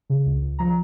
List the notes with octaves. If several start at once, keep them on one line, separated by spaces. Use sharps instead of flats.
C#3
C#2
C#2
F3 A#5